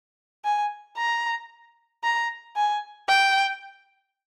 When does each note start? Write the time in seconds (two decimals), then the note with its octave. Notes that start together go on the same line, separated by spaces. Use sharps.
0.45 G#5
0.97 A#5
2.04 A#5
2.56 G#5
3.08 G5